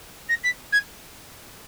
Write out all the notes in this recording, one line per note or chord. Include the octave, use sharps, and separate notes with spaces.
A#6
B6
G#6